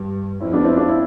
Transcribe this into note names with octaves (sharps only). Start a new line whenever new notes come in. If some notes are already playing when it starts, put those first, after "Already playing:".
Already playing: G2
F2 C4 E4
B3 D4
C4 E4
D4 F4
C4 E4